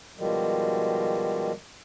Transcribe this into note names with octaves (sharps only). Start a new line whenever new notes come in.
B2 D#3 F3 G3 G#3